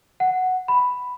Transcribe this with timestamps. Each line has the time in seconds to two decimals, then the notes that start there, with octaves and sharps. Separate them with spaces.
0.20 F#5
0.68 B5